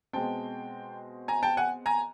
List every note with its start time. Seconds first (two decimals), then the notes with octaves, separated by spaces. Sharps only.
0.13 B2 G#3 C4 G5 A5
1.28 G#5 A#5
1.43 G5 A5
1.57 F#5 G#5
1.86 G#5 A#5